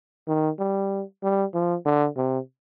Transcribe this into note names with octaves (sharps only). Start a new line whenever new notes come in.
D#3
G3
G3
F3
D3
C3